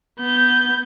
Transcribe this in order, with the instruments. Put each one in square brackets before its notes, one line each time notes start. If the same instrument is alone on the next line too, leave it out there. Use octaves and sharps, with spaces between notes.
[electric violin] B3 G6